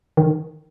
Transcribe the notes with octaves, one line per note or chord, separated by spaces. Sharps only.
D#3